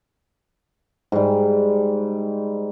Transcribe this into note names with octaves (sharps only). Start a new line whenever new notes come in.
G#2 G3